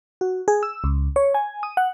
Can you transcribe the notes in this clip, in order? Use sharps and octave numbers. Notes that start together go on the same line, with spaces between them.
F#4
G#4
E6
C#2
C#5
G#5
D#6
F#5